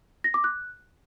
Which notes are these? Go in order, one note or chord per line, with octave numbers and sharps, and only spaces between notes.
A#6
D6
F#6